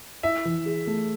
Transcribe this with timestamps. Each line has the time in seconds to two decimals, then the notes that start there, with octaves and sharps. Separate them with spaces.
0.23 E4 E5
0.45 E3
0.66 G#4
0.87 A3